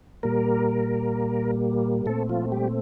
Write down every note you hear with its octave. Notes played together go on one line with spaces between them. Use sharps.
A#2 G3 A#3 A#4
A#2 A3 C4 A4
F3 F4
G3 G4